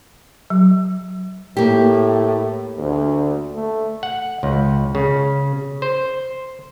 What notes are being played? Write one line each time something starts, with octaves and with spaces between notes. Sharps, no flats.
F#3
A2 A#3 G4
D2
A3
F#5
C#2
C#3
C5